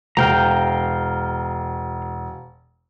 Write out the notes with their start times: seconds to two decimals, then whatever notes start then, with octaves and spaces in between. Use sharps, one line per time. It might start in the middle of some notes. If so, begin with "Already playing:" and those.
0.17 E1 F5 G5 A#5